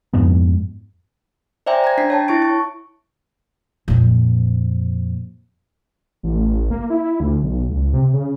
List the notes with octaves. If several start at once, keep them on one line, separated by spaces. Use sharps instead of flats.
F2 G#2 G#3 B3
C5 D5 E5 G5 G#5 A#5
A#5 G#6
D4 B6 C7
C#5 G5 A5
E4 C#6 A6 D7
C#6
F2 A#2
A1
A#3
E4
D2
B1
C#2
C3
C#3